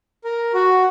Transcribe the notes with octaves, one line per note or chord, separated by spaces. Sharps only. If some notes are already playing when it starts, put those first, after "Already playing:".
A#4
F#4